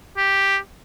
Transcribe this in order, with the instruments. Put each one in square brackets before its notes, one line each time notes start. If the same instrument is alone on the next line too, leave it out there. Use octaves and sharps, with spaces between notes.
[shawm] G4